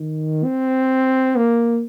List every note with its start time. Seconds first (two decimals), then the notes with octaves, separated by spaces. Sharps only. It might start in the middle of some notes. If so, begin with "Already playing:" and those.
Already playing: D#3
0.44 C4
1.36 A#3